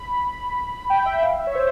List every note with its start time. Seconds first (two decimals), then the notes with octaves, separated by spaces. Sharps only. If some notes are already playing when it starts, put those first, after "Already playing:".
Already playing: B5
0.90 G5
1.06 E5
1.22 F5
1.39 E5
1.47 C#5
1.55 C5